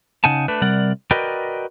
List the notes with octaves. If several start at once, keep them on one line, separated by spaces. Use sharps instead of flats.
C#3 D#4 F#5 G#5 A5
A3 D4 B4
C3 G3 A#4 D5 F#5
F#4 A#4 B4 D5 D#5 G5